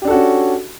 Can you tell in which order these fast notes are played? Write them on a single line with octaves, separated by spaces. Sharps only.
G4 D4 A4 F#4 C#4